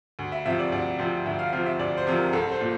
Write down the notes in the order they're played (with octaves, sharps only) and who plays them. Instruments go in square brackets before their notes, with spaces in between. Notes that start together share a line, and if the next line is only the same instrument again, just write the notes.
[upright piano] D2
E5
C3 F3 C4 E5
D5
D2 D5
C3 F3 C4
D2 E5
F5
C3 F3 C4 F5
E5
D2 D5
C5
C3 F3 C4
A#4
C2 A4
C5
A#2